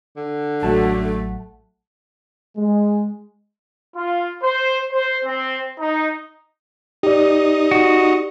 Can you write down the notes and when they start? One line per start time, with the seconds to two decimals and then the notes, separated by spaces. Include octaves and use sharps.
0.17 D3
0.63 A1 F#3 A3 F#5 A5
2.56 G#3
3.95 F4
4.41 C5
4.91 C5
5.24 C4
5.79 D#4
7.03 D#4 G4 D5
7.71 F#4